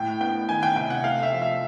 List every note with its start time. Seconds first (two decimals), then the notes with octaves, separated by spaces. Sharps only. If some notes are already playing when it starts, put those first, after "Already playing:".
Already playing: A2 G5
0.20 B3 G5
0.48 D#3 G#5
0.63 G5
0.76 C3 G5
0.90 F#5
1.04 A3 F5
1.23 E5
1.32 F3
1.42 E5